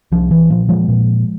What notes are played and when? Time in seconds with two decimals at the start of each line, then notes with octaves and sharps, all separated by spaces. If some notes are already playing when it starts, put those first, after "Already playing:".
0.12 C2 F3
0.31 E3
0.50 A#2 F3
0.69 F3 G#3
0.88 A#2